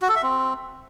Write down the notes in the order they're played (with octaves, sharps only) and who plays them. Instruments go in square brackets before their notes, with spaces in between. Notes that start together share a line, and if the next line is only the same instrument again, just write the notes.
[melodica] F#4
A4
E5
C4